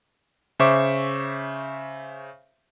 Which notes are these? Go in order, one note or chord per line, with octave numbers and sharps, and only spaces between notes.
C#3 C5 E5 C#6 D6